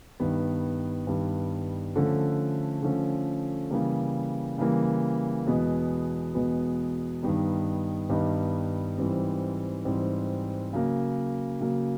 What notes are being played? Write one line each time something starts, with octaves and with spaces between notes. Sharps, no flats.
G2 D#3 G3 B3
G2 D#3 G3 B3
D3 F3 A3 C#4
D3 F3 A3 C#4
C#3 E3 G3 A#3
C#3 E3 G3 A#3
E2 B2 G#3 B3
E2 B2 G#3 B3
G2 D#3 G3 B3 D#4
G2 D#3 G3 B3 D#4
G#2 E3 G3 C4
G#2 E3 G3 C4
C#3 F#3 A#3
C#3 F#3 A#3